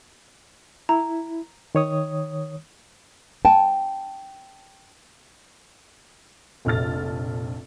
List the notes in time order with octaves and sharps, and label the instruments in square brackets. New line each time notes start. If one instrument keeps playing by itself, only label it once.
[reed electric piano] E4 [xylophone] A#5
[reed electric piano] D#3 C#5 D#6
[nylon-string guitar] G5 A5
[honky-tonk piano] F1 A#1 A4 F6 A6